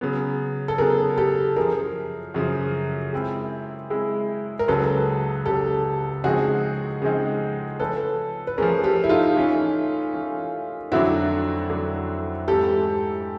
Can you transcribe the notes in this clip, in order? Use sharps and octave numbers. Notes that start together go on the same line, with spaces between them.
C#3 F#3 B3
A4
C#3 F#3 B3 G#4 A#4
G4 A4
F#2 C#3 F3 G#4 A#4
F#2 C#3 F3
G#3 C4 E4
G#3 C4 E4
A#4
C#2 C#3 F#3 A4 B4
C#2 C#3 F#3 G4 A4
C#3 F3 G#3 C4 D#4 F#4 G#4
C#3 F3 G#3 C4 D#4
F3 A3 C#4 A4 B4
B4
F3 A3 C#4 G#4 A#4
G4 A4
E4
D#4 F4
E3 A3 C#4
E3 A3 C#4
F2 D3 F#3 A3 D4 E4 F#4
F2 D3 F#3 A3 D4
G#2 E3 A3 C4 G4 A4